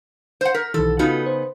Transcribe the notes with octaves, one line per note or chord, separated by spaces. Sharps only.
C5 F#5
A#4 B6
B1 D#3 E3 A4
C#3 B3 D#4 F4 F#4 A4
C5